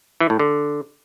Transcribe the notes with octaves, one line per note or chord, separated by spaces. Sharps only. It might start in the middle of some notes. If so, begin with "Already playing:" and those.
E3
A2
D3